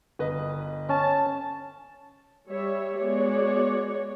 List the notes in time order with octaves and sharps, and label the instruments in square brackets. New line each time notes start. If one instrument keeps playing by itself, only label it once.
[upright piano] G1 B4 D#5
[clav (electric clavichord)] C#4 [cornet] A5
[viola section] G3 C#5 E5
G#3 B3 F#4 C#5 D5